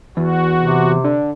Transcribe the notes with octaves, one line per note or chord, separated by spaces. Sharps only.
E2 F#4
C3
D3